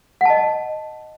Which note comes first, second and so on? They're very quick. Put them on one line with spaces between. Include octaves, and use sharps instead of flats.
F#5 A5 D#5